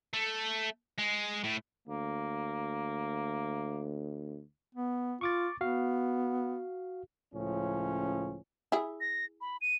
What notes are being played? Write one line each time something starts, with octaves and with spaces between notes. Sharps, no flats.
A3
G#3
A2
D2 A#3
B3
F4 C#6 D6 A6
B3 F#4 F5
C#2 A2 F3 C#4
E4 G#4
A#6
B5
D#7